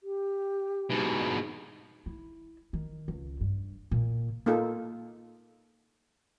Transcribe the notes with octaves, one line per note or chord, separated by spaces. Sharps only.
G4
G#2 B2
E4
D#3
C#2
G2
A#2
A#3 D#4 F4 A4